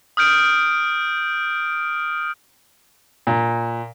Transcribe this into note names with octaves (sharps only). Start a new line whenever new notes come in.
D#6 F6 G6 D7
A#2